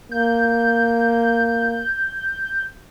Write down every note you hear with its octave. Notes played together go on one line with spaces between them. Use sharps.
A#3 G6